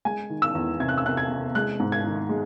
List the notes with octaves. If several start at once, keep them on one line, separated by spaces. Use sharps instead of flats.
G#3 G#5
D#3
E6
E2
C3 G#6
F#6
E6
C3 F#6
G#6
C3
G#3 F#6
G#2
G#6
D#3
G#3